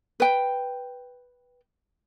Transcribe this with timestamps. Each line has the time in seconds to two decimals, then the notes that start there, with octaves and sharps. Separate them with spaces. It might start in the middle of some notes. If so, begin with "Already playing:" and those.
0.20 B4 G5